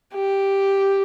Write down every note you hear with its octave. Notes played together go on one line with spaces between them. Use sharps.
G4